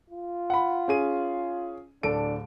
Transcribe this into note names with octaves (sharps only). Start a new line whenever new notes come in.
F4
F#5 B5
C#4 G#4 D#7
D1 D4 A4 D7